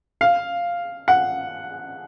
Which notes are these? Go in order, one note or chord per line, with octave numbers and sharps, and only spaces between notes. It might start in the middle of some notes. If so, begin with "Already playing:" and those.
F5
F#5